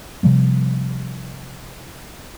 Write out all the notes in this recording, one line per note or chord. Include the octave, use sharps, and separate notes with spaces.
C3 F3 G3 A#3